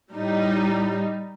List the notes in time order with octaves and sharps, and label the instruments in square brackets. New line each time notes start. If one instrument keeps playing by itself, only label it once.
[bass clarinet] A2 [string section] G3 D#4